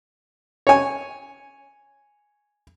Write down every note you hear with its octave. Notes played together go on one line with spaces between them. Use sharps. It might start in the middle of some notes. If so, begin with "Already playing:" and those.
C#5 G#5